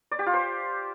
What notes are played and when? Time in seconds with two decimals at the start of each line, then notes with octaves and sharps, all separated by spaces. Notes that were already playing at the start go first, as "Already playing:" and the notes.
0.11 D5
0.19 G4
0.26 F4
0.34 C5